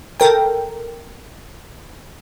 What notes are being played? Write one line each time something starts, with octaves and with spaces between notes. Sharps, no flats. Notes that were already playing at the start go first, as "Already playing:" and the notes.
A4 A#4 G5